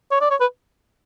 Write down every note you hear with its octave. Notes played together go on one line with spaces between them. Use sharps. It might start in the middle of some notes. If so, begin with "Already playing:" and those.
C#5
D5
C#5
B4